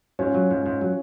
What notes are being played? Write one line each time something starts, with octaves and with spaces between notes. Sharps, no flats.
G#2 C#4 F4
F#3
G#2
G#2
F#3